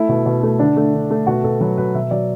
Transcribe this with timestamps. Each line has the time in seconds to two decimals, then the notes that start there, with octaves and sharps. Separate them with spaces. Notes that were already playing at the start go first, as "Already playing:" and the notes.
Already playing: A3 E4
0.09 B2
0.26 B2
0.43 A3
0.59 D3 D4
0.76 A3
0.93 D3
1.11 A3
1.27 B2 F#4
1.44 B2 A4
1.60 F#3 B4
1.77 B2 B4
1.94 B2 E5
2.11 F#3 D5